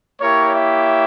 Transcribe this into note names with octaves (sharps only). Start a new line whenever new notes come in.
A#3 E4 G4 A#4 C#5
C#5 E5